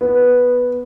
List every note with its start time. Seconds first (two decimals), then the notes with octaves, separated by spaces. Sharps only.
0.01 B3